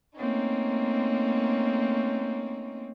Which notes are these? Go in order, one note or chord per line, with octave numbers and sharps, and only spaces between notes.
A3 A#3 C4 C#4 D#4